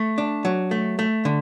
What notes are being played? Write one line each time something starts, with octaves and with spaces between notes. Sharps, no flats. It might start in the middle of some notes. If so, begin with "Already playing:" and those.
Already playing: A3
D4
F#3
A3
A3
D3